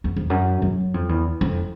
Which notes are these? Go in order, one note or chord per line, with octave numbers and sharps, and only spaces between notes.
E2
F2
F#2
F#2
F2
E2
F2